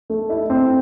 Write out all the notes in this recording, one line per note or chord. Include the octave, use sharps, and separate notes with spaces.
A3
E4
C4